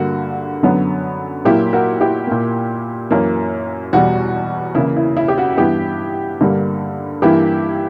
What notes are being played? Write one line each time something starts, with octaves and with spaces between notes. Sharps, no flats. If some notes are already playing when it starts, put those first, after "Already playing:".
Already playing: G2 D3 A#3 F#4
F#2 D3 F#3 B3
A#2 F#3 A#3 E4 G4
F#4 A#4
E4 G4
A#2 A#3
F#2 E3 A#3
E2 B2 G3 F#4
C#3 E3 A#3 E4
E4
E4
G4
F#4
G2 E3 B3 E4 G4
G2 D3 G3 A#3
G2 E3 A#3 E4 G4